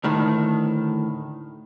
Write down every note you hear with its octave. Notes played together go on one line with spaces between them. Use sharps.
D2 A2 D#3